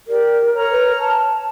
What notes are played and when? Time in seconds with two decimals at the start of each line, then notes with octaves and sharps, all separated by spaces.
0.08 G4 A#4 D5
0.54 C#5 A#5 F6
0.71 B4
1.00 A5